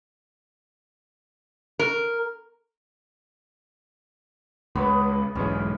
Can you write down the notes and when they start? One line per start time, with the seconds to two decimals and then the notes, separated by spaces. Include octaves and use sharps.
1.79 A#4
4.75 C#2 B3 B4
5.35 B1 E2 G#2 C#4